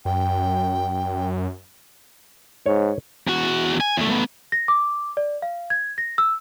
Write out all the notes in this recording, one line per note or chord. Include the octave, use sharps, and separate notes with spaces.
F#2 G5
G#2 C#5
E2 F#4
G#5
E2 A3
A3 B3
A#6
D6
D5
F5
G#6
A#6
E6